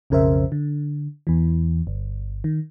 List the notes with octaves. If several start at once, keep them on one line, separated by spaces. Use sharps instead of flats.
B1 F2 C#3 A#4 C5 E5
D3
E2 E3
G1
D#3